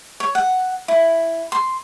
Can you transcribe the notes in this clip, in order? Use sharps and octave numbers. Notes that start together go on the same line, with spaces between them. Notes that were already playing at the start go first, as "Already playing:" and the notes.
C#5
F#5
E4
C6